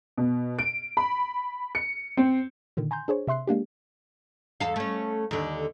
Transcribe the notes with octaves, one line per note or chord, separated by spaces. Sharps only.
B2
D7
B5
C#7
C4
A#2 D3 D#3
G#5 A#5 C6 G6
D4 G#4 C5 C#5
C3 E5 C6 F#6 C7
G#3 A#3 D4 G4
E2 A4 F5
A3 C#4
D#2 D3